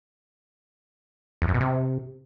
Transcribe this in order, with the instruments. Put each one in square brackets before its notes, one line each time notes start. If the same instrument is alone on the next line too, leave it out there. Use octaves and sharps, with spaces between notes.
[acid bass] E2
F#2
B2
C3